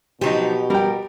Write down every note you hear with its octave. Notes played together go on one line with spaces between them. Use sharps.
B2 F3 F#3 D#4 G4
G3 A#4 G5